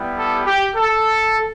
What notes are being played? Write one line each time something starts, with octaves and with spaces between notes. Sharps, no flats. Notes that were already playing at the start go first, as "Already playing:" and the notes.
Already playing: G3 B3 E4 G4
A4
G4
A4